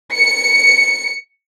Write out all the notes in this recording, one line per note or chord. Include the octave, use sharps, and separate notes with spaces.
C#7